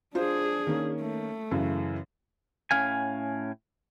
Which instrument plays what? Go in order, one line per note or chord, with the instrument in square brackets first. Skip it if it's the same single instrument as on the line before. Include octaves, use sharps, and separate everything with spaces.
[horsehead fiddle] D4 G#4 [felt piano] F4 C5
[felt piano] D#3 A#3 C#4
[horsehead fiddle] A3
[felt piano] F#2 C#3 E3
[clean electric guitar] A2 C#4 F5 G#5